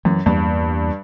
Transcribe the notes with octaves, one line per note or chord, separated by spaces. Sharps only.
F#2 E3
E2 G2 A#3